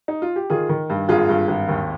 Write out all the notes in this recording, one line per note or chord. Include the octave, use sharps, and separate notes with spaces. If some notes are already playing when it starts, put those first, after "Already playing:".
D#4
F4
G4
D#3 F4 G#4
D#3
G2
G#1 F4 G#4
G2
G#1
D#2